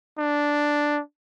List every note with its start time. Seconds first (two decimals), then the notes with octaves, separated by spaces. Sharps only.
0.18 D4